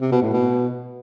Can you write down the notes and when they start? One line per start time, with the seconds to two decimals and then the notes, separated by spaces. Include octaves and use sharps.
0.01 C3
0.12 B2
0.22 A2
0.33 B2